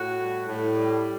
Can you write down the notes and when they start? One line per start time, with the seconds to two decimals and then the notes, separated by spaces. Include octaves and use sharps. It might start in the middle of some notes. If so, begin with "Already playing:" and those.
Already playing: A2 F#4
0.17 G3
0.47 A2
0.76 G3